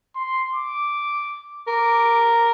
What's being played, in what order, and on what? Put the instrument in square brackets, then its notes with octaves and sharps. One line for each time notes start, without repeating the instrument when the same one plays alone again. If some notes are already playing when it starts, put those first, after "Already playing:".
[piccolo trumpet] C6
D6
[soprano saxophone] A#4 [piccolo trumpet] D6